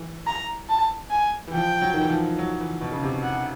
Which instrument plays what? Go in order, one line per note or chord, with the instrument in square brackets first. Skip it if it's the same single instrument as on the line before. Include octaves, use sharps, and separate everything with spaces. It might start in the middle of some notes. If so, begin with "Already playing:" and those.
Already playing: [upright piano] E3
[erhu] A#5
A5
G#5
[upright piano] E3
[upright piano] F3 [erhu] G5
[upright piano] F#3
D#3
E3
F3
F#3
E3
B2
C#3
C3
[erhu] F#5